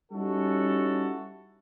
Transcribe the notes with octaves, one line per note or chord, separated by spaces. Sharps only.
G3 C#4 D#4 E4 F#4 A4